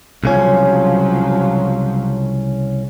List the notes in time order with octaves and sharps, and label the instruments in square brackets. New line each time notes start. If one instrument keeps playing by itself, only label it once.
[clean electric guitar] C2 C#3 C#4 [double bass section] F3 F#3